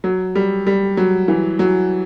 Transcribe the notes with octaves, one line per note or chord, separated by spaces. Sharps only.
F#3
G3
G3
F#3
E3
F#3